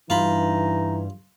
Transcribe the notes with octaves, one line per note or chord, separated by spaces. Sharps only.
G2 E3 D#4 F4 B5